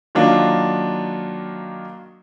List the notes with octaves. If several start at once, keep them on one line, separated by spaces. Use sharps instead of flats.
D#3 F#3 A#3 D4 D#4 F4